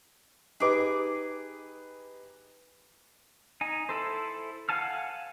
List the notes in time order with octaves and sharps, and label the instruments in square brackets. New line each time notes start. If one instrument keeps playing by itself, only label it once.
[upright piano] D#4 G4 B4 [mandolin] G#4 D6
[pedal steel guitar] D#4 G#5
E4 A4 C5
F5 F#5 G#5 A5 F6